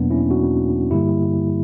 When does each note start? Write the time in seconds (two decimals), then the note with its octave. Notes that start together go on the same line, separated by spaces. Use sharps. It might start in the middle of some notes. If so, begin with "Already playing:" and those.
Already playing: E2 B2 F#3 A#3 B3 D4
0.10 C#4 E4
0.31 D4 F#4
0.91 G2 D3 G3 A#3 E4 G4